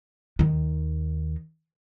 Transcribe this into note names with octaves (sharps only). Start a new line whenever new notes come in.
D#2 D#3